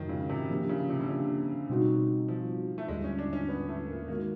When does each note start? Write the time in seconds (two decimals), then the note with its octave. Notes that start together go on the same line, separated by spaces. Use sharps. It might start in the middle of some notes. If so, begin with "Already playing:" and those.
Already playing: F2 C3 D#3 F3 F#3 G#3
0.09 C#3
0.29 C3
0.50 F3 A#3 D4 G4
0.69 C#3
0.90 C3
1.00 D3
1.09 C#3
1.69 B2 G3 C4 D#4 F#4
2.28 F3
2.78 A3
2.88 D#2 D3 G3 G#3
3.04 C#4
3.18 D4
3.33 C#4
3.48 B3
3.68 A3
3.87 A#3
4.08 D#3 G#3 A#3 B3 D#4 F#4